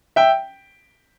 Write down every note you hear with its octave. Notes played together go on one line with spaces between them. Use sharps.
E5 G5